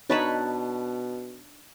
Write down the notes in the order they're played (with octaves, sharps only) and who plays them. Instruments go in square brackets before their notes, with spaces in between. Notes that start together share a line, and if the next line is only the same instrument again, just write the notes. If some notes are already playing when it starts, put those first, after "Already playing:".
[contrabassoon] B2 [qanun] D4 B4 A5 [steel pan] D#4 C#5 B5